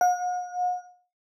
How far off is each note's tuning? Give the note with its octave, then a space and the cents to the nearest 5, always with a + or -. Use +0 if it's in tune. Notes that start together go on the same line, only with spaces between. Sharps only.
F#5 -45